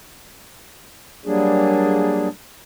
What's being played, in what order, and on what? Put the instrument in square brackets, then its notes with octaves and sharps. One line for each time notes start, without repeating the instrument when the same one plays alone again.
[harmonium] F#3 G3 A#3 D4 G#4